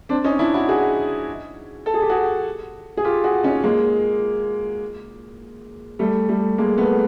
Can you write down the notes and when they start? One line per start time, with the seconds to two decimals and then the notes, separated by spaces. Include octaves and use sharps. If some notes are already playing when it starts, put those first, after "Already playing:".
0.09 C4 D4
0.24 C#4 D#4
0.39 D4 E4
0.54 E4 F#4
0.69 F#4 G#4
1.86 A4
1.94 G#4
2.02 G4
2.10 F#4 G#4
2.97 G#4
3.04 F4 G4
3.24 F#4 G#4
3.43 C#4 D#4
3.64 G#3 A#3
5.99 G3 A3
6.29 G3 A3
6.58 G#3 A#3
6.78 A3 B3